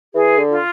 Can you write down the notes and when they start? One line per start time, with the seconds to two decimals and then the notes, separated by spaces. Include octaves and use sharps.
0.14 E3 G#4
0.38 D3
0.50 F4